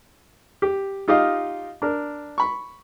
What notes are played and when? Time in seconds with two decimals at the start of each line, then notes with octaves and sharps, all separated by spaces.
0.62 G4
1.08 D#4 F4 G4 D#5 F5
1.82 D4 A#4
2.38 B5 C#6